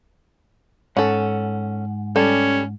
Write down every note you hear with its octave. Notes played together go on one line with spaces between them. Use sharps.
G#2 C#4 A4 F#5
G3 C#4 A4